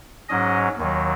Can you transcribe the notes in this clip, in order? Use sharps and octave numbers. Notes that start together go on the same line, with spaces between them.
G#2 F#3 C#4 D#5
D#2 D#3 F#3